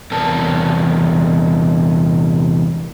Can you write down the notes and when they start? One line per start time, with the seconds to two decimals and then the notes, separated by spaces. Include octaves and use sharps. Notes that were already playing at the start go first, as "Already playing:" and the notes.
0.11 E2 C3 E3 A#4 B4 A5